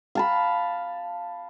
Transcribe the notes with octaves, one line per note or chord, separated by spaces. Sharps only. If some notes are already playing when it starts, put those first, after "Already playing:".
F5 A5 B5